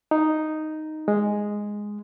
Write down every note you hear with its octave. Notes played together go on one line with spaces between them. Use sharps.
D#4
G#3